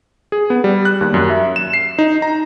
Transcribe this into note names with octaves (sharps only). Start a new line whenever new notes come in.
G#4
B3
G3
F#6
D#2
F#2
E5
E7
C7
D#4
A#5